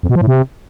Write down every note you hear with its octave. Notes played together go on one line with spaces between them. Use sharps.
F2
B2
F3
A2
C3